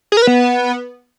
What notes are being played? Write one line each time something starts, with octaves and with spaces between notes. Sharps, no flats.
G#4
A#4
B4
B3